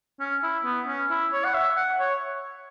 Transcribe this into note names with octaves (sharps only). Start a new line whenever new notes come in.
C#4
E4
B3
C#4
E4
C#5
F#5
E5
F#5
C#5